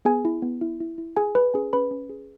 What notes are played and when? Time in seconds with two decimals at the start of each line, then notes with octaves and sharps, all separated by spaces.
0.05 B3 G#4 G#5
0.25 E4
0.42 B3
0.61 E4
0.81 E4
0.98 E4
1.17 G#4 G#5
1.35 G#4 B4 B5
1.54 C#4 G#4 G#5
1.73 C#4 B4 B5
1.91 C#4
2.09 G#4